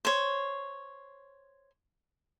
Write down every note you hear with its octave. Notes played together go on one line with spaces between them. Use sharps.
C5 C#5